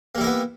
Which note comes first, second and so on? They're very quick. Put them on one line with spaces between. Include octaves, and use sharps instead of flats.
A#3 G3 E4 A#4 B3